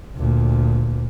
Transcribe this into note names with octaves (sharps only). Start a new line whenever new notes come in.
D2 A#2